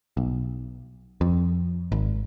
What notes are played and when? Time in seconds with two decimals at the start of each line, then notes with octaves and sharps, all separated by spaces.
0.17 B1
1.21 F2
1.92 G#1